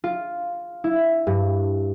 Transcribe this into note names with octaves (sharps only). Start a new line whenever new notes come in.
F4
E4
G2